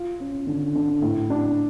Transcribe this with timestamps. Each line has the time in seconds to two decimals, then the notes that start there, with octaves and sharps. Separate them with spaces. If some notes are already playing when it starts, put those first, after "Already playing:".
Already playing: F4
0.20 C#4
0.47 D3
0.75 D3
1.02 A2
1.30 D4